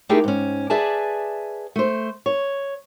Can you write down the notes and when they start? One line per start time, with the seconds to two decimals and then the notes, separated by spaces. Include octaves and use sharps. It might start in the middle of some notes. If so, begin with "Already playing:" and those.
0.09 A3 D#4 E4 G4 G#4 A#4
0.24 G#2 C#4
0.70 G#4 B4 D5 E5 G#5 A5
1.76 A3 C5
2.26 C#5